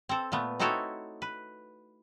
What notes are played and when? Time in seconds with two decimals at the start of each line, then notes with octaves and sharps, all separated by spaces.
0.09 C4 A4
0.32 A#2 A3 B3
0.59 C4 D#4 E4 F#4 A4 C#5
1.22 B4